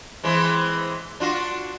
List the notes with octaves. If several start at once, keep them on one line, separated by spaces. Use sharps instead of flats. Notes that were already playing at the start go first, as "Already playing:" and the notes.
E3 G#3 C4
D4 F4 F#4